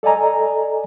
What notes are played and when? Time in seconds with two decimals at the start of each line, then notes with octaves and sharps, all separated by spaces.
0.03 A4 D5 D#5 G#5 A#5